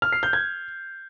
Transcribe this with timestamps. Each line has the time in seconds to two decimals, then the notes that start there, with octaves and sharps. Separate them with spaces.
0.02 F6
0.12 C7
0.23 G6
0.33 G#6